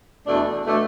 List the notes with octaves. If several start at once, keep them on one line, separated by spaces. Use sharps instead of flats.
E2 B2 A3 D4
B2 A3 D4